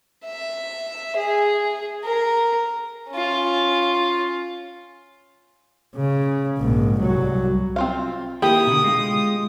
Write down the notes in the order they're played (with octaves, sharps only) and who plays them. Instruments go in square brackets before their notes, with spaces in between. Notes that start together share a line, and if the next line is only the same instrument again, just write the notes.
[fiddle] E5
G#4
A#4
C#4 F4
[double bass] C#3
A#1 G#2
C2 F#3
[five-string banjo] C4 F4 F5
[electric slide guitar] D#3 A#3 E4 [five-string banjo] G4 [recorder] D#6
[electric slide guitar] B2 D3
G#3 F4